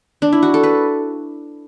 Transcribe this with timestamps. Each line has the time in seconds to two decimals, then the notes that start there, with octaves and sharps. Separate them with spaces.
0.22 D4
0.33 E4
0.43 F#4
0.54 A4
0.63 B4